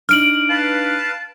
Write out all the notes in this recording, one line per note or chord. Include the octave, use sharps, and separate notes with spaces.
D4 D#4 F6 D7 F#7
B4 F5 A5